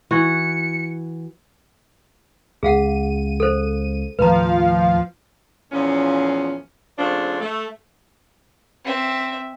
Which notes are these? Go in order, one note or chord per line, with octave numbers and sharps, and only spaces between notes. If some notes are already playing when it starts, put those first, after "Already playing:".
E3 F#4 C#7
C#2 G#4 F5 F#5 D#7
A4 C5
D#2 A2 F3 G3 B4 F5 A#5
E2 A#2 F3 C#4
C#3 F3 A3 C4 D4
A3
C4 E5